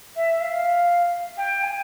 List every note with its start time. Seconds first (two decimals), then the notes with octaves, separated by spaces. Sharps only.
0.16 E5
0.41 F5
1.38 G5
1.63 G#5